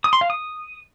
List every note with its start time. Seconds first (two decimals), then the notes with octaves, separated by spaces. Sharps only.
0.04 D#6
0.13 C6
0.21 F5
0.30 D#6